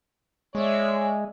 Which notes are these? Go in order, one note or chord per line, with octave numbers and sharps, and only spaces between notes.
G#3 C#5 D5 E5